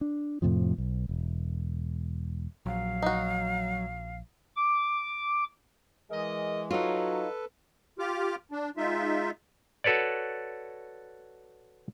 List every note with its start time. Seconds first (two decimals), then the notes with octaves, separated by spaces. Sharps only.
0.01 D4
0.42 F2 A2 C3 F3
0.78 B1
1.09 E1
2.66 A#1 F#3 F5
3.02 D#4 F#4
4.56 D6
6.11 E3 G#3 G#4 A#4 D#5
6.71 F#3 D#4 F4 A4 B4
7.99 F4 G4 D6 F6
8.52 D4
8.77 G#3 D#4 F4 E5
9.84 F#4 A4 B4 C#5 D5